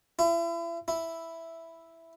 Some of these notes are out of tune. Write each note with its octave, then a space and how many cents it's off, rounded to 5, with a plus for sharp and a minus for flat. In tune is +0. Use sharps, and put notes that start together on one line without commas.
E4 +35
E4 +0